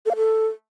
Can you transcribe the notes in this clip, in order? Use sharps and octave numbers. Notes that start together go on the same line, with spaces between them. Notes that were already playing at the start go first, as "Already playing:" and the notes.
A4
F5
A4